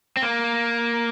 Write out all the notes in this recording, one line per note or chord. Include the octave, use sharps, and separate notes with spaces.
C4
A#3